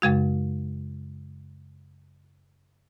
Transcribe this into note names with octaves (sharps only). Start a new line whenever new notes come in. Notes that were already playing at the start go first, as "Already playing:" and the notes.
F#2 C#3 G#3 F#4